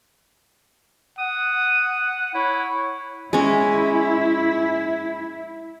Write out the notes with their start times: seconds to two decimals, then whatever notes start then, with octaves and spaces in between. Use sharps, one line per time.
1.19 F#5 D#6
2.34 E4 C#5
3.33 G#3 C#4 E4